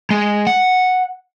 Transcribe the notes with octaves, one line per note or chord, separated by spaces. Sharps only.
G#3
F#5